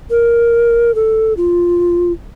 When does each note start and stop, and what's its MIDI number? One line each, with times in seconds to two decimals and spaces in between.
0.11 0.94 70
0.95 1.33 69
1.37 2.12 65